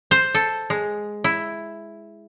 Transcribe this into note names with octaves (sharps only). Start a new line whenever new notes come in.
C5
A4
G#3
E4